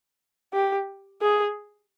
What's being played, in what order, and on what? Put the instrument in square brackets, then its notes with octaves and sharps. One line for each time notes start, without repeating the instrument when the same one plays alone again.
[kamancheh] G4
G#4